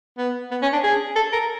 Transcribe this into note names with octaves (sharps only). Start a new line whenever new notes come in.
B3
B3
C#4
D4
G#4
A4
A#4